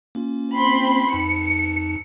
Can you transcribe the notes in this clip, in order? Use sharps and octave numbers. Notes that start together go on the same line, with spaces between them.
A#3 C#4 F4
C4 B5 C6
F2 D#4 A5 C#7